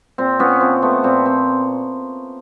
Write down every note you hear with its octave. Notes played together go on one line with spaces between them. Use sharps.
A#2 C4
A#2 B3 C#4
F3 C4
A3 B3
A#2 C4
A#2 C4